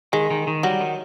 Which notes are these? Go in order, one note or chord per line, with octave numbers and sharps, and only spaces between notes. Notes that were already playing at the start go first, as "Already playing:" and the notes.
D#3 G#3
D#3
D#3
F#3 G3
D#3